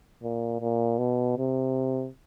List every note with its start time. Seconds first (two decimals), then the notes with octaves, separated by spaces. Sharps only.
0.23 A#2
0.61 A#2
0.98 B2
1.38 C3